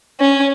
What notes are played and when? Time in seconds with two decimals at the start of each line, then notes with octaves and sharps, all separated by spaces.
0.20 C#4